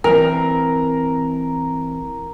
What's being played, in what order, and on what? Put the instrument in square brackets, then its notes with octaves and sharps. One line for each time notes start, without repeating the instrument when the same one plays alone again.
[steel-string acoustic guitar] E3 C4 [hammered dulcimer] A#4